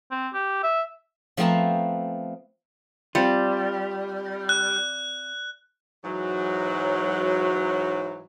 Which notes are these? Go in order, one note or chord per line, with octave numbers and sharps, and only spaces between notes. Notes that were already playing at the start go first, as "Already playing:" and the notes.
C4
G4
E5
F3 A3 B3 C4 E5 A#5
G3 C4 F4
F#6
G#2 E3 F#3